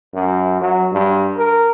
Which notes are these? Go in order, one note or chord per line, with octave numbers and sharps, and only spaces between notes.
F#2
F#3
G2
A#4